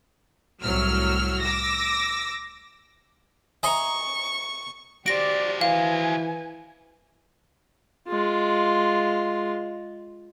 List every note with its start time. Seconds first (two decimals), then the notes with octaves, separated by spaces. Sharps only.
0.62 C2 A2 F#3 E6 F6
1.40 D6 E6 A#6
3.63 D#5 E5 G#5 A#5 C#6
5.06 F#4 G4 C5 D5 A#6 D7
5.61 E3 F5 G#5
8.08 G#3 F4